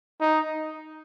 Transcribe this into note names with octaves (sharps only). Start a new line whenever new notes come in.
D#4